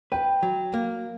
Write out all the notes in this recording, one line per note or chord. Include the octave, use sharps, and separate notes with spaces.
B4 G5
F#3
A#3